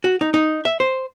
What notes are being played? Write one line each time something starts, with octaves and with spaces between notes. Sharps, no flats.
F#4
D#4
D#4
E5
C5